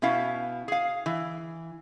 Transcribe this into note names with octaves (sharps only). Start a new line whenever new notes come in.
B2 C#4 E4 F5
G#4 F5
E3